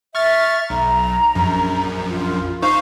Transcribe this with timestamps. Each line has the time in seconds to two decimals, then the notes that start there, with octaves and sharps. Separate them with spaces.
0.15 E5 C#6 F6 A6
0.70 B1 A#5
1.35 A#1 F#2
2.09 F4
2.62 D#4 C5 F5 C#6